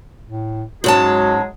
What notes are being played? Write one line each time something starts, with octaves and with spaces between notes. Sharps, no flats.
A2
G#2 F#3 G#3 C#4 F#4 G#4 A5